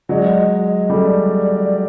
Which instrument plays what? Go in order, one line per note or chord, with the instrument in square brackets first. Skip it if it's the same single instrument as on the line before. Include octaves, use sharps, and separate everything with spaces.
[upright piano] F#3 G#3 [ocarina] D5
[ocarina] D#5
D#5
[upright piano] G3 A3 [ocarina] D5